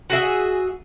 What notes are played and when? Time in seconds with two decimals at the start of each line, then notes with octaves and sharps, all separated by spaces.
0.10 F#4 G#4 E5